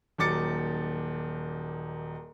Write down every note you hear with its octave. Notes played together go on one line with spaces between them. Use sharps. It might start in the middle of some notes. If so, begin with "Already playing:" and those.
D#1 D#2 F#3 D6 A6 C#7